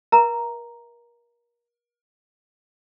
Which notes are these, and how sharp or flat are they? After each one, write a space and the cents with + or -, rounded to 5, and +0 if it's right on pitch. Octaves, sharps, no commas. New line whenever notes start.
A#4 +35 E5 +0 A#5 +0